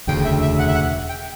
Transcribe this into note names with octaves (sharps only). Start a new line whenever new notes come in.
E1 D2 C#3 G5
E5
E5
F#5
E5
F#5
G5